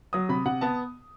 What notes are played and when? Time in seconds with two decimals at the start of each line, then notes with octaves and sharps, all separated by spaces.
0.13 F#3 D#6
0.29 C3 B5
0.46 C3 F#5
0.61 B3 A5